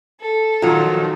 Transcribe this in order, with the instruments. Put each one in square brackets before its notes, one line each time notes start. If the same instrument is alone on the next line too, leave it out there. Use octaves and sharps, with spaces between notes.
[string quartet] A4
[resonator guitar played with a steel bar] A#2 F#3 [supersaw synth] D#3 F3 [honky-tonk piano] F4